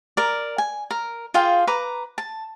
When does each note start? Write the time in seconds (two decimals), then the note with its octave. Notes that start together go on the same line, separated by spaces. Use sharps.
0.17 A#4 D5
0.58 G#5
0.91 A#4
1.34 F4 G#4 F5 G5
1.67 B4 A#5 D6
2.18 A5